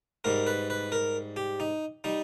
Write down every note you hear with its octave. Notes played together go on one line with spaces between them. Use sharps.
G#2 G3 A#4
B4
B4
A#4
G4
D#4
G3 D#4